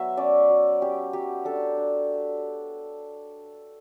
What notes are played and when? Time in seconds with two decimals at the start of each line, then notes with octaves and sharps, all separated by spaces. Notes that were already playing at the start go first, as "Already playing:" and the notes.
Already playing: F#3 B3 E5
0.17 C#4 D5
0.49 F#3
0.81 C#4 G4
1.13 F#3 G4
1.45 D4 A4
1.77 D4